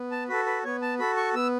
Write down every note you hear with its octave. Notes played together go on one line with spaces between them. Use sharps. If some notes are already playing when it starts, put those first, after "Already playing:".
Already playing: B3
A5
F#4 A4 B4
B4
B3 C#5
A5
F#4 A4 B5
C#6
B3 E6